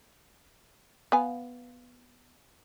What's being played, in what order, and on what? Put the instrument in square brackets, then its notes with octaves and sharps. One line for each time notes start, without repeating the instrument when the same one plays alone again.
[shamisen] B3 F5 G#5